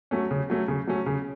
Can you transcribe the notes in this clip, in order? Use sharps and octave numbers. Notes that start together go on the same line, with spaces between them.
F#3 A3 C#4
C#3
F#3 A3 C#4
C#3
F#3 A3 C#4
C#3